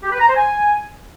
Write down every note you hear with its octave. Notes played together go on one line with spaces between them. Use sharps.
G4
B4
A#5
C5
G#5